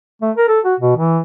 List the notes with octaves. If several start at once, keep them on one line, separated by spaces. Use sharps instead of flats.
A3
A#4
A4
F#4
B2
E3